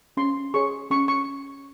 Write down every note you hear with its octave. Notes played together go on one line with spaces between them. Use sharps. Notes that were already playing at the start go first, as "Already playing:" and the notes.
C#4 C6
G#4 C#5 C#6
C#4 C#6
C#6